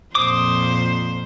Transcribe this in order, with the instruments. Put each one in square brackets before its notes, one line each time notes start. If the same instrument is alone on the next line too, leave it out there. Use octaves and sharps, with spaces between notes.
[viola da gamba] F2 A#2 C5 [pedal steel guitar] D6 D#6